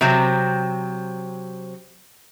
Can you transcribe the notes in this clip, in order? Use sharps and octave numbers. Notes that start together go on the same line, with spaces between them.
C3 F#3 C4